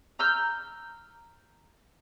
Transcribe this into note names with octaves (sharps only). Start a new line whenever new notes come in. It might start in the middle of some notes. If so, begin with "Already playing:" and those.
A#5 E6 F6 G6